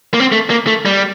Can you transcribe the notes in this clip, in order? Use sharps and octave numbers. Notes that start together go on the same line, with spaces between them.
A#3
C4
A3
A#3
A3
G3